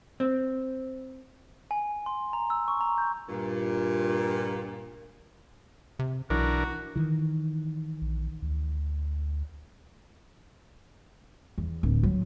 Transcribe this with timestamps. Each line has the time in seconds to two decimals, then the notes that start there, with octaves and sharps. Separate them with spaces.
0.20 C4
1.71 G#5
2.06 C6
2.33 A#5
2.50 E6
2.68 C#6
2.81 A#5
2.98 G6
3.29 G2 A#2
5.99 C3
6.30 B1 E3 D4 F#4 A#4
6.96 D#3 E3
8.02 A#1
8.42 D2
11.58 E2
11.83 D1
12.03 F#3